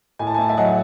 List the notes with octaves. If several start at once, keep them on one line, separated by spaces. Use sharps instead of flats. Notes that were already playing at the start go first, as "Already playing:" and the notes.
A2 G#5
A5
G#5
A3 A5
E5 G#5
F#3 D#5 F#5